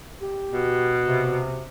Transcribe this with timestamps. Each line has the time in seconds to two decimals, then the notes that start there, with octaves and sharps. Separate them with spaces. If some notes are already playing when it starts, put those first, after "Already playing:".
0.21 G4
0.53 B2
1.06 C3